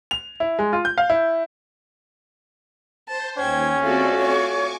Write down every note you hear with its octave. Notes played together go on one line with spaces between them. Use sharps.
F7
E4
G#3
F4
G6
F5
E4
C5 A5
D#2 C#4 G5 G#6
A3 C4 F4 F#4 G#4 A4 D5
C#5 G#5 C#6 D6